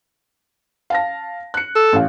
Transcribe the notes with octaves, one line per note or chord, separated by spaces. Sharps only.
F5 A5 A#6
F#6 C#7
A4
A1 F5